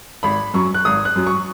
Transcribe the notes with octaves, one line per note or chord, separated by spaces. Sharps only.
G#1 B5
F#2 F#3 C#6
F#6
G#1 D#6
F#6
F#2 F#3
C#6